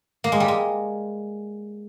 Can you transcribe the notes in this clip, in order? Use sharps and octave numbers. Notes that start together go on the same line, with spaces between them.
A#3
G#3
G3
G#3